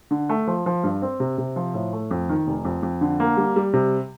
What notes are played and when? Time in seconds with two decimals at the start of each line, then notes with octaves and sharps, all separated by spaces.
0.11 D3
0.29 A3
0.47 F3
0.66 F3
0.84 G2
1.02 C4
1.20 C3
1.38 C3
1.56 F3
1.74 A2
1.93 A3
2.11 F2
2.29 D#3
2.47 F1
2.65 F2
2.83 F2
3.01 D3
3.20 A#3
3.37 G3
3.56 G3
3.73 C3